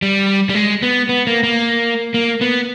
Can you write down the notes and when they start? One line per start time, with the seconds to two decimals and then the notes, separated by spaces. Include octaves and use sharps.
0.02 G3
0.49 G3
0.55 G#3
0.82 B3
1.09 B3
1.27 A#3
1.43 A#3
2.14 A#3
2.41 B3